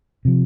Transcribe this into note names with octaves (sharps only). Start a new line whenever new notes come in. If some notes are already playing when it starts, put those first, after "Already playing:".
C3 F3